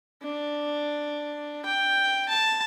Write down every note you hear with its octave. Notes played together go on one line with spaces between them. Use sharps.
D4
G5
A5